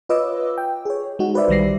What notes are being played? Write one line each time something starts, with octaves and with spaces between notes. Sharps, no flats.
F4 B4 C#5 D#5 D6 E6
G5
G#4 C#5
G#3 D#4 F#4
F#4 B4 C5 D5 E5
B1 D#3 G3 A#6 C7